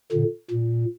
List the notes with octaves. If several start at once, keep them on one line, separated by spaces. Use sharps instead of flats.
A#2 D3
A#2